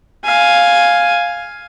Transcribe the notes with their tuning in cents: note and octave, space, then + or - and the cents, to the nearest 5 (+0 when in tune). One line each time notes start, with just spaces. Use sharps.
F5 +5 G#5 +0